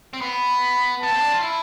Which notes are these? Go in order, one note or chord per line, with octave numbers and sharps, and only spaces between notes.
C4
B3 B5
B3 A5
C4
D4
F4
E4